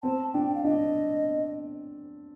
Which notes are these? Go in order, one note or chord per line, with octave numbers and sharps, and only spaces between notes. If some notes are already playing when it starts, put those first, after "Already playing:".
C4 A5
D4 G5
G5
F5
D4 D#5